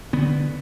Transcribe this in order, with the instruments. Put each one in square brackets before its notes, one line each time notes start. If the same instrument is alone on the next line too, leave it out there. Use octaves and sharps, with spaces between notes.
[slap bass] D3 B3